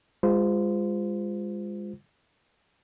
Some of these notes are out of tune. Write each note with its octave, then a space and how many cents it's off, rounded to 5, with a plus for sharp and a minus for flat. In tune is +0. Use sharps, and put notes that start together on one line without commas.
G#3 -30 F4 +0 C5 -30